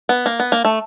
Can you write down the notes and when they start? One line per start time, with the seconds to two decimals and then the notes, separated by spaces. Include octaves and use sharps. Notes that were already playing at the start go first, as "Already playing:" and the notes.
0.09 B3
0.26 A#3
0.40 B3
0.52 A#3
0.65 A3